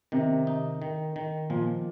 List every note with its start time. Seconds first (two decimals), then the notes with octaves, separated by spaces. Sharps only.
0.12 C3 D#3
0.47 D#4
0.82 D#3
1.16 D#3
1.50 A#2 F3